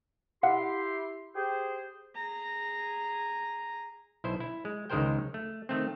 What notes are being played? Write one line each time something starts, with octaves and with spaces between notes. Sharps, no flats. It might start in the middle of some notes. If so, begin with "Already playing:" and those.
E4 G4 F5 F#5 C6
G4 G#4 C5
G#4 A#5
B1 E4 C5
E4
G#3
C#2 D#3 G#3 A#4 C5 G5
A3
D#3 A3 C4